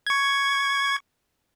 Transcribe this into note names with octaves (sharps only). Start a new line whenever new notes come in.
C#6 G#6